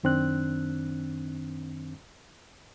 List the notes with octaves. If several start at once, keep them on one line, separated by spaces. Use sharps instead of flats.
F#2 D#3 C4 D4 F#6